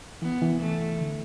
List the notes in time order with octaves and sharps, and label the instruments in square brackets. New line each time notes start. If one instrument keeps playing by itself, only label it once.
[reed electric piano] E3 [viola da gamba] B3
[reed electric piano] E3
[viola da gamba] A3
[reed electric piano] D3